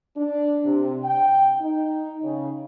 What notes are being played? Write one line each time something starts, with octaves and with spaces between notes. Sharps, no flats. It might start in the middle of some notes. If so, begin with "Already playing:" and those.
D4
C3
G5
D#4
C#3